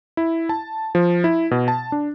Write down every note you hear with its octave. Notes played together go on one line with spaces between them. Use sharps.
E4
A5
F3
E4
B2
A5
D4